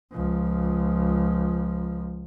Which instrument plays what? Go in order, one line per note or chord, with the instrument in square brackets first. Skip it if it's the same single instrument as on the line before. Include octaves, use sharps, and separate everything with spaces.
[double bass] C#2 F3